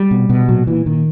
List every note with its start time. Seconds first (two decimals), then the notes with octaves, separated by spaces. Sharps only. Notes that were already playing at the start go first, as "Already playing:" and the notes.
Already playing: G3
0.11 B2
0.29 B2
0.48 A#2 F#3
0.67 A#2 E3
0.86 A#2 D#3